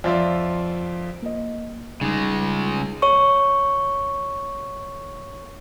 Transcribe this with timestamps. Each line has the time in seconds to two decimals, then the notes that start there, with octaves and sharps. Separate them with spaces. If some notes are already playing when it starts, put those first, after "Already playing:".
0.04 F2 F4 D5 E5 C6
1.22 A#3 D#5
2.01 C#3 G3 G#3 D#4
3.02 C#5 C#6